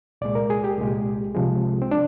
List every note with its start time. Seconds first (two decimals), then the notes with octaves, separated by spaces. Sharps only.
0.21 C2 A#2 G#3 D5
0.35 A#4
0.50 G#4
0.64 G4
0.78 C2 A#2 G#3
1.35 C2 C3 F3 G#3
1.82 C4
1.91 D4